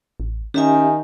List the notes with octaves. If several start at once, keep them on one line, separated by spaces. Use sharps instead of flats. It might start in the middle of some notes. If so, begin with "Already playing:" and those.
A1
D#3 C#4 G4 E5 G#5